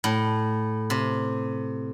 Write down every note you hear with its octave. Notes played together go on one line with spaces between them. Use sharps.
A2
C3